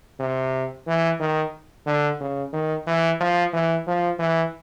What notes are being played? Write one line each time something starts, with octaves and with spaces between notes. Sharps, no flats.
C3
E3
D#3
D3
C#3
D#3
E3
F3
E3
F3
E3